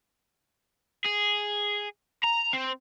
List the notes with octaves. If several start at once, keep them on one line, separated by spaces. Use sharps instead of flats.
G#4
A#5
C4